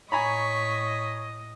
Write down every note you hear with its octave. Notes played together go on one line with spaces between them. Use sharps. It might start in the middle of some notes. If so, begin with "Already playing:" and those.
A2 C#5 D#5 G#5 A#5 B5 C#6 B6